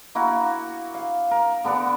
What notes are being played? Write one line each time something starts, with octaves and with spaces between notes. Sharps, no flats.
A#3 E4 F#4
F5
A#4
D3 B3 D4 F#5